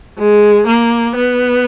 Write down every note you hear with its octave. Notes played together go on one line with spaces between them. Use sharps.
G#3
A#3
B3